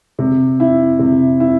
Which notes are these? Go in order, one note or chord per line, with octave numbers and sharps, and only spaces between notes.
C3
E4
C3
E4